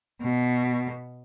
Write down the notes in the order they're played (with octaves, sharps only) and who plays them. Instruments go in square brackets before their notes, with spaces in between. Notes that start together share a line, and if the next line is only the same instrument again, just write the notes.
[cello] B2